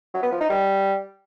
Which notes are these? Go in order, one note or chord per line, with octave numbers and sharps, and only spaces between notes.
F#3
B3
F3
D#4
G3